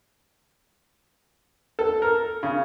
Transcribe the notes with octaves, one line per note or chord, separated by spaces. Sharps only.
A4
A#4
C#3